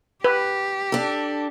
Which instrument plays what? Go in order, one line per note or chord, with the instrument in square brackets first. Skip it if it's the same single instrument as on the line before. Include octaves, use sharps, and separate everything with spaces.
[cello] G4 [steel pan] B4
[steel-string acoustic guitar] D4 A4